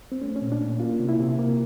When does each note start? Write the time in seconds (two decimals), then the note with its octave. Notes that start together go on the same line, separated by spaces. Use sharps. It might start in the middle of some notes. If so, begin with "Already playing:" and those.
0.12 C4
0.22 A3 C#4
0.36 C#4
0.42 A#2
0.52 D4
0.61 A#2
0.80 A#3 F4
1.00 C3
1.09 E4
1.19 C3
1.38 A#3